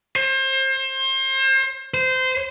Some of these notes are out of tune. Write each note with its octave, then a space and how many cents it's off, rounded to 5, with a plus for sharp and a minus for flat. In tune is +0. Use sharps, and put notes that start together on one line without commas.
C5 +30
C5 -20